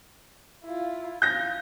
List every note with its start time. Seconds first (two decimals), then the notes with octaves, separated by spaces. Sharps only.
0.64 E4 F4
1.22 F5 G6 A#6